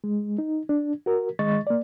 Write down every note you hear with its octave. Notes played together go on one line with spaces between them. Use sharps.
G#3
D#4
D4
F#4 A#4
D#3 G#3 D#5 C#6 A6
A#3 D5